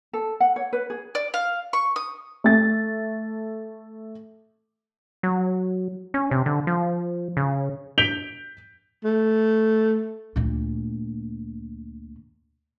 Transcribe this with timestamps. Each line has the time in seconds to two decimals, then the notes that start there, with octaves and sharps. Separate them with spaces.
0.13 A4
0.40 F#5
0.56 C#5
0.73 B4
0.90 G#4
1.15 D5
1.34 F5
1.73 C#6
1.96 D#6
2.44 A3 A6
5.23 F#3
6.14 C#4
6.31 C3
6.46 D3
6.67 F3
7.37 C#3
7.98 G6 B6 D7 F7 G7
9.04 A3
10.36 D2 A#2